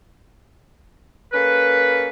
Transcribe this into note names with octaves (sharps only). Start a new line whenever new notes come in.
A#3 C#4 A4 B4